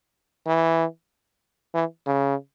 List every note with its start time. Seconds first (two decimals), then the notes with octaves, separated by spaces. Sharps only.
0.47 E3
1.74 E3
2.06 C#3